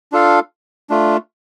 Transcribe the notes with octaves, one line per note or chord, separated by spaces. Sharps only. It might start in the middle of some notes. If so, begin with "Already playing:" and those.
D4 F4 A4 F5
A3 D4 F4